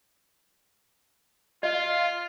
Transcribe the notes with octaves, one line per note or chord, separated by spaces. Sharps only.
F4 D#5